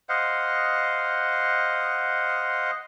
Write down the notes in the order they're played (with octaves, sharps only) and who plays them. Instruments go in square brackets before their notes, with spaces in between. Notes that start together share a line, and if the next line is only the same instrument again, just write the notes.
[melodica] C5 D#5 F5 F#5